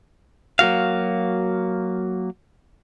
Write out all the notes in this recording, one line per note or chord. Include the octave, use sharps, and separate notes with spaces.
F#3 A#3 F#4 F5